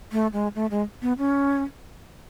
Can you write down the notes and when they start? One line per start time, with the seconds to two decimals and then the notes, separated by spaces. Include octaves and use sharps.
0.12 A3
0.33 G#3
0.55 A3
0.71 G#3
1.02 B3
1.18 C#4